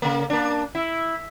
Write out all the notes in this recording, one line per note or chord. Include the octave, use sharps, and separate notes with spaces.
C#3 A#3
A#3 D4
E4